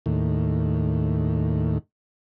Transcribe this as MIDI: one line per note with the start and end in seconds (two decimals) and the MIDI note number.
0.06 1.78 39
0.06 1.78 45